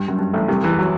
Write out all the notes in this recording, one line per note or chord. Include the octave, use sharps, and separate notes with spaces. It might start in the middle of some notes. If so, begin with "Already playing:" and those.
Already playing: G2
F#2
G2
A1 A2
C2 C3
E2 E3
F#3